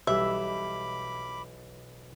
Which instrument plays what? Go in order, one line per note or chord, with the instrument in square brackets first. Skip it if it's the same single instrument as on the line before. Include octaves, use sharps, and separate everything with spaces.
[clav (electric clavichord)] B1 E3 [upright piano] G3 [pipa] E5 [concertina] B5 D6